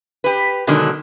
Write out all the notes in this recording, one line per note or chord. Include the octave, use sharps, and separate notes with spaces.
G4 B4
B2 D3 D#3 F#3 G#3 D4